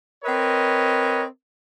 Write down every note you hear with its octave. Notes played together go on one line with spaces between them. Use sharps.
C4 A#4 B4 C#5 D#5